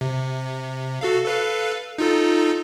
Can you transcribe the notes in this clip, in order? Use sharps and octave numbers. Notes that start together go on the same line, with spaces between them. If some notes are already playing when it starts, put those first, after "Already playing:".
C3
F#4 A4 F5
A4 B4 F5
D#4 F4 A4